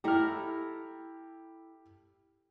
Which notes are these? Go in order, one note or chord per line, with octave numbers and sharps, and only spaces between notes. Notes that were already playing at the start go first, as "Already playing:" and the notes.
E4 G4 A4 A#5 F6